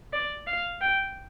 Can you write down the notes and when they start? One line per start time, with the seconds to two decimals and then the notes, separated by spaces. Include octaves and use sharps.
0.13 D5
0.47 F5
0.81 G5